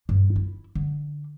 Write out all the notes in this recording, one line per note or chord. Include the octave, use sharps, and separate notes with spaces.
G2
E4
D3